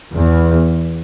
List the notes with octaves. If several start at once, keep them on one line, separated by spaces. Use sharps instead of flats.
E2